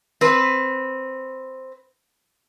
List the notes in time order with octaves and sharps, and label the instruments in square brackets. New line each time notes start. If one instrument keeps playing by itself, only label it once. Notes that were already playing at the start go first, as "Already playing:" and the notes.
[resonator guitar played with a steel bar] C4 B4